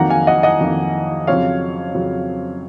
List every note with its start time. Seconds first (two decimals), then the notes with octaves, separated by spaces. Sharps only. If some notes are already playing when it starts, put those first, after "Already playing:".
Already playing: F2 D#3 F#3 A#3 D#4 F#5 A#5
0.10 F5 G#5
0.27 D#5 F#5
0.43 D#5 F#5
0.61 F2 D#3 F#3 A#3 D#4
1.27 F2 C#3 F#3 C4 F4 C#5 F5
1.95 F2 C#3 F#3 C4 F4